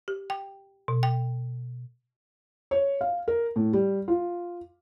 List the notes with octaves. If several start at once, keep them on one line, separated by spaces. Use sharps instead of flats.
G4
G5
B2
G5
C#5
F5
A#4
A2
G3
F4